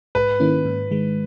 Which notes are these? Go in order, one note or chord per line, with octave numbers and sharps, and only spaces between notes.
G#2 B4
D#3 A#3 C#4 E4
G#2
D#3 G#3